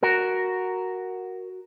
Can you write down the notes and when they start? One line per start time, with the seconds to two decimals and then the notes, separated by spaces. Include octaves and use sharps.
0.03 F#4 A#4